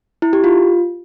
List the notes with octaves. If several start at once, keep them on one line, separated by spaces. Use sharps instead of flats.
E4
G4
F4